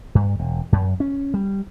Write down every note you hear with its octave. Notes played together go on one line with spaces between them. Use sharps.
G2
E1
F#2
C#4
G3